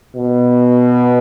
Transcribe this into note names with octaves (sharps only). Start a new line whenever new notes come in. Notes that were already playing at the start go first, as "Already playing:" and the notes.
B2